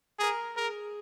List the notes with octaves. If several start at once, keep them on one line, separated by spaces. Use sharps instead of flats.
G#4 A#4
G#4 A#4